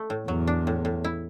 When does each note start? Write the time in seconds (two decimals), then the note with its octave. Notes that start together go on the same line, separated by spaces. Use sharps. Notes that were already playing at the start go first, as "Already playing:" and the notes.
Already playing: A3
0.10 A2
0.28 E2 F#3
0.47 D4
0.67 A2
0.85 A2
1.04 E4